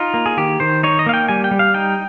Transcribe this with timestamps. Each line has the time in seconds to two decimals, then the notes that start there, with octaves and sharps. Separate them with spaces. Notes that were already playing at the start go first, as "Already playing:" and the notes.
Already playing: D#4 F4
0.14 A#3
0.26 G#4
0.37 D#3 G4
0.60 D#3 C5
0.83 D#4 C#5
0.99 D#5
1.06 A#3 F5
1.14 G5
1.29 G3 G#5
1.44 G5
1.51 G3
1.59 F5
1.74 D#4 G5